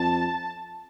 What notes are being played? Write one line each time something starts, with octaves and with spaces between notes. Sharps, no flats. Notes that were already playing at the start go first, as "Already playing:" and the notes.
Already playing: F2 A5